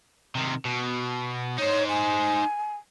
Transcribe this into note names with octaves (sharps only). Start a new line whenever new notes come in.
C3 D#3
B2
D#4 C5 C#5
G#5